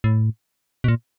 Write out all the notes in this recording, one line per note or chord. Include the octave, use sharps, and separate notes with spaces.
A2
B2
A#2